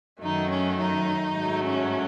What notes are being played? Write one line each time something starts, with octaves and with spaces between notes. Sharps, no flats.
F#2 D#3 F#3 A3 D#4
C#4
D#4
G#2 F#3 A3
C#4